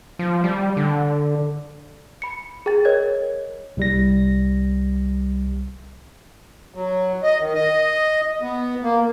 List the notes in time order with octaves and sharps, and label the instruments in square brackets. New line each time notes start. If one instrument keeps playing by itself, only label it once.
[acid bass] F3
G3
D3
[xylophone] B5 C#7
G#4 G5 A6
A#4 C#5 D#5 G#6
[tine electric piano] C2 G3 A#6
[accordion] F#3
D#5
D#3
D#5
B3
A#3